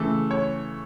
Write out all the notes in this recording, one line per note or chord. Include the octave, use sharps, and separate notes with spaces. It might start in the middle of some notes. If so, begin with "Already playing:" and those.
Already playing: C#3 E3 A3 A4
C#5